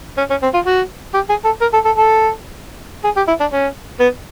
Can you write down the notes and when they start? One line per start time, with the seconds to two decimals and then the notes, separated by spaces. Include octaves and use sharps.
0.17 C#4
0.30 C#4
0.42 C4
0.54 F4
0.65 F#4
1.14 G4
1.29 G#4
1.45 A4
1.61 A#4
1.73 A4
1.85 A4
1.97 A4
3.04 G#4
3.16 G4
3.27 E4
3.40 D4
3.52 C#4
4.00 B3